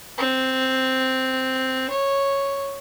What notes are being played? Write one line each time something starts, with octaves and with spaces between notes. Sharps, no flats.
C4
C#5